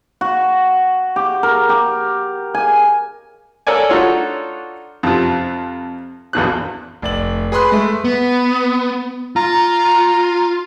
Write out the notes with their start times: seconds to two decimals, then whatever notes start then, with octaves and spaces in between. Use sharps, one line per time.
0.21 F#4
1.16 G4
1.43 A#4
1.69 G4
2.54 G#5
3.67 A4 A#4 C#5 D5 G#5
3.89 D4 D#4 F4 F#4 A4 C#5
5.03 F2 C3 F4
6.33 A#1 E2 B2 F#6
7.02 F1 D5 F#7
7.52 G#4 B4 B5 C6 F#6
7.72 G#3 A3
8.04 B3
9.36 F4 A#5